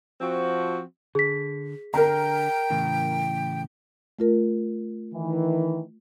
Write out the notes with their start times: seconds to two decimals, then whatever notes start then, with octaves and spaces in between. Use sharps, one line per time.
0.21 F3 C4 F#4
1.15 D3 G#4 B6
1.94 D3 D4 A#4 G5 A#5
2.70 A2 C#3 E3
4.19 A3 F4 A#4
5.14 D#3 E3